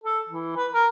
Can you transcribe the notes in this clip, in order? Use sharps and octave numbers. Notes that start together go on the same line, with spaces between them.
A4
E3
B4
A#4